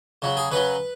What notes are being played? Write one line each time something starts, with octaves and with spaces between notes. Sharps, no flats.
C#3 F#3
G#4
C#3 F#3 B4